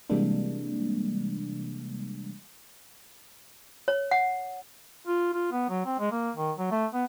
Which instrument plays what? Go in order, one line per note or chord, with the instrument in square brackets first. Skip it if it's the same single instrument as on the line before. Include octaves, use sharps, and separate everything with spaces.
[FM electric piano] C3 E3 G3 G#3 A#3 D4
[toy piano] C#5
F#5
[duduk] F4
F4
B3
F#3
C4
G#3
A#3
D#3
F#3
A3
B3